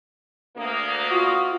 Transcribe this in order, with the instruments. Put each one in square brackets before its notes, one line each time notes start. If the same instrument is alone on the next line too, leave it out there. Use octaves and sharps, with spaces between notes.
[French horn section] D2 A#3 [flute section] D#6
[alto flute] F4 [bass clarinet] F#4